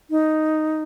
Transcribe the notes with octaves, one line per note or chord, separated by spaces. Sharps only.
D#4